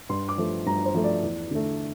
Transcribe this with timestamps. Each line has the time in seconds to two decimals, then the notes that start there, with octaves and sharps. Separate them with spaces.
0.09 G2 C6
0.29 D6
0.38 F3 A3
0.66 G2 A#5
0.85 C5
0.95 F3 A3
1.04 D5
1.23 E2
1.51 D3 A3